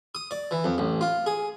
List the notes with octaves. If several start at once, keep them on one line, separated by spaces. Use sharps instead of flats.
D#6
D5
E3
F2
A1
F4
G#4